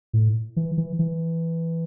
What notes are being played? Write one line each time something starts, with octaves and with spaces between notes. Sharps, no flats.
A2
E3
E3
E3